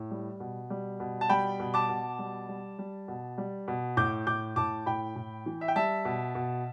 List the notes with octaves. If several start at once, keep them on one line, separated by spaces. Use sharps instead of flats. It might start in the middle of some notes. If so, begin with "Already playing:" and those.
Already playing: A2
G3
B2
G3
B2
A5
G3 G5 B5
B2
A5 D6
B2
G3
G3
G3
B2
G3
B2
A2 D6 G6
A2 D6 G6
A2 A5 D6
A2 G5 B5
A2
E3
E5
G5
G3 E5 A5
B2
B2